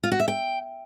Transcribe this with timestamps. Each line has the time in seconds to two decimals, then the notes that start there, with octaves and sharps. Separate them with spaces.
0.03 F4
0.12 F#4
0.20 E5
0.28 G5